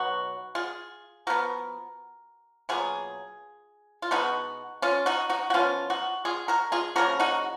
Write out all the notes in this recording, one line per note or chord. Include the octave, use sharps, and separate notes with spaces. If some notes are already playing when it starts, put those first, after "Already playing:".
Already playing: B2 F#3 B3 D#4 F#4
F4 G#4
F3 B3 F#4 A#4
B2 F#3 A#3 F4 G#4
F4
B2 G#3 B3 D#4 F#4
C#4 F4
D#4 F#4
D#4 F#4
F#4
F3 B3 C#4 F4
D#4 F#4
F4 G#4
F#4 A#4
F4 G#4
C#3 F3 A#3 F#4 A#4
D#4 F#4